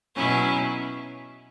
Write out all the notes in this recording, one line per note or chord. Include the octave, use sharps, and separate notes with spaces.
B2 F#3 C#4 E4